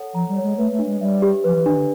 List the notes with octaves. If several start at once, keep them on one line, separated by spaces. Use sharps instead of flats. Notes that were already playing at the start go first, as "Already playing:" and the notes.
Already playing: A4 C#5 F#5
F3 A#5
G3
C#5
G#3
A3 B4
A3
D4
G#3
G3 E5
G4
F3 B4
E3
D#3 D4
D3